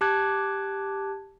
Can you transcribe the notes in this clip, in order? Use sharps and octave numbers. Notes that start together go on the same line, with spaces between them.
G4 A5 D6 F#6 G#6